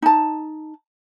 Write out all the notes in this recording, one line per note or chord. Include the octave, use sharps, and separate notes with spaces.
D#4 A5